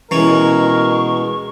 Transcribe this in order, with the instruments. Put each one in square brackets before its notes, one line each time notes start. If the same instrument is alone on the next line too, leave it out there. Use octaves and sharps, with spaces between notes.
[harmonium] B2 G#3 [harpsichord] E3 C#4 [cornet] A#4 [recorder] C#6